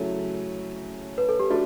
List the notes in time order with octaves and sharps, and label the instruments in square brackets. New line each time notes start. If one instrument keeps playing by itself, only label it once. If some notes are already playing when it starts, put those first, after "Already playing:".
Already playing: [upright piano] C#3 F#3 A3 C#4 [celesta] E4
[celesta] B4
A4
G4
[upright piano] A3 D4 [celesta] F#4